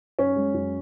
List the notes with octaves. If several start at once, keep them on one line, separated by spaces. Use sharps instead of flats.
F#2 C#4
G#3
F#2